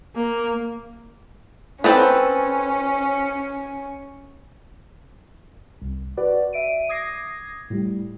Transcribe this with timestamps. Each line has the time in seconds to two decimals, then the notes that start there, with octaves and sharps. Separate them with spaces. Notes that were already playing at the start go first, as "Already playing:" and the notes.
0.16 A#3
1.84 C4 C#4 A4 B4
5.81 C2
6.17 F#4 B4 D5
6.53 E5 D7 D#7
6.89 D6 D#6 G#6 A#6 C7
7.70 A2 G3